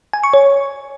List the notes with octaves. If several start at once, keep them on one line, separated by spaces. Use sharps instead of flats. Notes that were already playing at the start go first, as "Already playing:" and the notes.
G#5
C#6
C#5